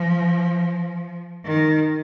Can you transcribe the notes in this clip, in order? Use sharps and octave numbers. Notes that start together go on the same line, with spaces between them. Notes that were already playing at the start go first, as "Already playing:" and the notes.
Already playing: F3
D#3